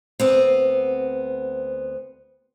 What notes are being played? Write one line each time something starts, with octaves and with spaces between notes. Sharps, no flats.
D2 B3 C4